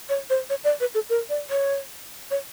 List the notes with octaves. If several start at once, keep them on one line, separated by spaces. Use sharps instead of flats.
C#5
C5
C#5
D5
B4
A4
A#4
D5
C#5
C#5